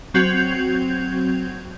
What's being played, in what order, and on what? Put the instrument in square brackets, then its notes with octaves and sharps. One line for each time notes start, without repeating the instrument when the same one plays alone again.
[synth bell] F#3 C4 F#4 G6 G#6 F7